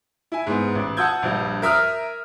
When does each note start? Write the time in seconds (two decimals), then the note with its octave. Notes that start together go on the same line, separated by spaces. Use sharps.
0.32 E4 G#5
0.46 G#2 B3
0.75 A1
0.97 F#5 A5 D#6 E6 G6 G#6
1.23 A#1 G2
1.62 A#4 E5 D#6 F6